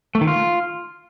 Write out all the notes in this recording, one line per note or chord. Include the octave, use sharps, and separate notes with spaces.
A3
D#3
F4